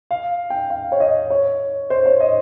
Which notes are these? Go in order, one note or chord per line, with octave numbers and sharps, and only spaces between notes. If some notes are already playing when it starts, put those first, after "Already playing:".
F5
G5
F5
C#5
D#5
C#5
C5
C#5
D#5